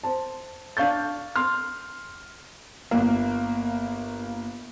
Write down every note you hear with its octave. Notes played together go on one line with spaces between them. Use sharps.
C5 A5
D4 F5 C#6 G6 A6
C6 F6
G1 A#3